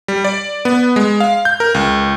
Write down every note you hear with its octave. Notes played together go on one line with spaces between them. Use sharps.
G3
D5
B3
G#3
F5
G6
A#4
C#2